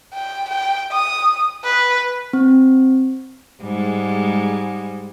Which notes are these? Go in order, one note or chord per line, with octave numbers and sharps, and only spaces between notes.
G5
G5
D#6
B4
C4
G#2 G3 G#3